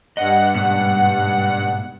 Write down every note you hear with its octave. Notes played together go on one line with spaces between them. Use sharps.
G2 D#5 F#5
G#2 B2